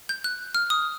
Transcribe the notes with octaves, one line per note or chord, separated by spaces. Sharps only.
G6
F#6
F6
D#6